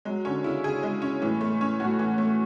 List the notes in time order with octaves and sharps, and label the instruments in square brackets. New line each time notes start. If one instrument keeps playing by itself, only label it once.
[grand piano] F#3 [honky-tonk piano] G#3
[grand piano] D3 [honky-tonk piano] C#4
[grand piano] C#3 [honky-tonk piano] E4
[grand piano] C#3 [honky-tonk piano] G#4
[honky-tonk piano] G#3
C#4
[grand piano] A2 [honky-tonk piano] E3
[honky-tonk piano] A3
C#4
[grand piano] A2 [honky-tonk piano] F#4
[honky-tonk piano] E3
A3